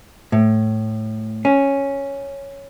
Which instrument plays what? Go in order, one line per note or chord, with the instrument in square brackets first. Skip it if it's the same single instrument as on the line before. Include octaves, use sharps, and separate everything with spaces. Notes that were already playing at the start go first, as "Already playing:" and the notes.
[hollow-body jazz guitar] A2
C#4